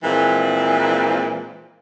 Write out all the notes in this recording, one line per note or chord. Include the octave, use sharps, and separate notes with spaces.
A#2 E3 F3 G#3 A#3 C4